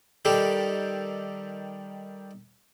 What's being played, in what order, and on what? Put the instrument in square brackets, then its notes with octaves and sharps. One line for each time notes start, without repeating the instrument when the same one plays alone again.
[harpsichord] D#3 G3 G4 A4